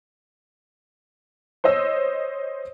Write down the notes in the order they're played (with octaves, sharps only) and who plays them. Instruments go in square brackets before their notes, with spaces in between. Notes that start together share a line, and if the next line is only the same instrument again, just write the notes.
[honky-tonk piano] C5 C#5 D#5 E6